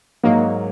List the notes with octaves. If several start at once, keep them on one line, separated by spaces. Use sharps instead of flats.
G#2 F#3 A#3 D#4 F#4